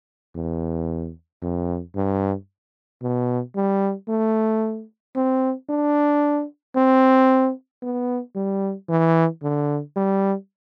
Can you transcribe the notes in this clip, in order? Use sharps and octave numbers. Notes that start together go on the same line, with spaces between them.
E2
F2
G2
B2
G3
A3
C4
D4
C4
B3
G3
E3
D3
G3